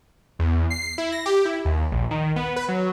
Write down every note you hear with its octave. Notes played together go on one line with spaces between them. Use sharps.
E2
C7
E4
A#6
G4
E4
D#2
A#1
D#3
B3
B4
F#3